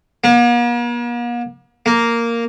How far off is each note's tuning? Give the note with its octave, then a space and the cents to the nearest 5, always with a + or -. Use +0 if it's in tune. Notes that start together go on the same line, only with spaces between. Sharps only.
A#3 +45
A#3 -5